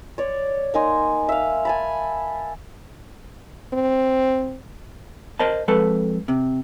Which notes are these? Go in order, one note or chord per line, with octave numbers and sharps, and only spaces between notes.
C#5 D5
A#3 D#4 G#5 C6
E5 F5
G#5 A5 B5
C4
A#4 C5 D#5 A5
F2 G#3 A4 B4 A5
C3